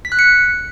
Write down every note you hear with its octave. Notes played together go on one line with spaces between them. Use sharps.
B6
F#6
C#7